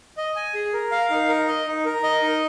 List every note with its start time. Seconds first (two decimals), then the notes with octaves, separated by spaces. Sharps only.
0.17 D#5
0.36 G#5
0.54 G#4
0.73 A#4
0.92 F5
1.10 D#4
1.29 A#4
1.48 D#5
1.67 D#4
1.85 A#4
2.03 D#5
2.22 D#4